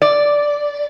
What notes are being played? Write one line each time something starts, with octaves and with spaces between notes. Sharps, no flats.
D5